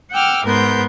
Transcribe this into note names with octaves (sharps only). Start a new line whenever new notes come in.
F#5 G5 D6 E6 F6
G#2 B3 A#4 C6 G6